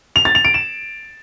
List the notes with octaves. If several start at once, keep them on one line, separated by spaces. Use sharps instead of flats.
F7
A6
F7
D7
E7